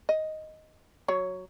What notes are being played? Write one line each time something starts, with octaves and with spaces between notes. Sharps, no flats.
D#5
F#3 C#5